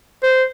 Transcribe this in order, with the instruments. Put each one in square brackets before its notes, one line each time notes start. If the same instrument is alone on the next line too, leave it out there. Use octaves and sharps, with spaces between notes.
[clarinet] C5